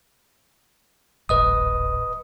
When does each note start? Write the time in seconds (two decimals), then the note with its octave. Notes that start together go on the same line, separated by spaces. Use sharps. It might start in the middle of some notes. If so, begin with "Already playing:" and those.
1.29 D1 G#1 B4 D#5 D#6